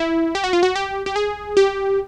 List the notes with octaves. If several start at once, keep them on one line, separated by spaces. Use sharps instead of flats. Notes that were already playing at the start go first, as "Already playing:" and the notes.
Already playing: E4
G4
F#4
F4
F#4
G4
G4
G#4
G4